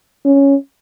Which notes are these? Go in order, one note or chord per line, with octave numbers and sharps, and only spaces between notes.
C#4